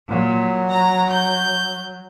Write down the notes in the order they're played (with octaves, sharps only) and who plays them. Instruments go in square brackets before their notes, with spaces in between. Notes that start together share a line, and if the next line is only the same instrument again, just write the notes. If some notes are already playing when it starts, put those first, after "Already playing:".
[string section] A#2 [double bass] F#3
[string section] A#5
G6